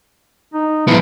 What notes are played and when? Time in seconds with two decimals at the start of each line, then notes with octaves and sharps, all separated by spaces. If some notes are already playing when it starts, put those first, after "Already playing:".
0.54 D#4
0.87 F3 B3 E4